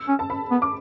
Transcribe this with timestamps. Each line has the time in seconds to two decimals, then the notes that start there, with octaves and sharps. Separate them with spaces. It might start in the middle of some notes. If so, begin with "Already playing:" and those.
Already playing: E6
0.08 C#4
0.19 A5
0.30 B5
0.51 B3
0.62 D6